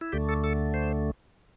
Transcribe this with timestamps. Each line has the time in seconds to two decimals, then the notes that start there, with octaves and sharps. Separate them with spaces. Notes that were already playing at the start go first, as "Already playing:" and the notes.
0.01 E4
0.12 D2 D3 A3 G4
0.29 A4
0.44 A4
0.74 C5